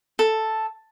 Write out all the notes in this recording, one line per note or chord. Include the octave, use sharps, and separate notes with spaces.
A4